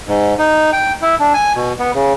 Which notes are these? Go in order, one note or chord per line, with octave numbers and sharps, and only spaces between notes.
G#2
D#4
G5
E4
D4
G#5
B2
B3
C#3